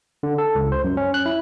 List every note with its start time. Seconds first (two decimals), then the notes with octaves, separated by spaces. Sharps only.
0.23 D3
0.38 A4
0.55 C#2
0.72 C5
0.84 F#2
0.97 C#4
1.14 F#6
1.26 E4